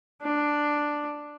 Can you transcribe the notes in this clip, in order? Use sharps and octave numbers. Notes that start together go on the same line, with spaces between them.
D4